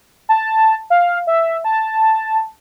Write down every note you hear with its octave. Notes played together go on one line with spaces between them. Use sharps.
A5
F5
E5
A5